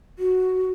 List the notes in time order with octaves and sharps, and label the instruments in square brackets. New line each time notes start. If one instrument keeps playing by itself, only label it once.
[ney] F#4